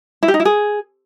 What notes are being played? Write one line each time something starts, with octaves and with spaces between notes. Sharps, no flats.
E4
G4
D#4
E4
G#4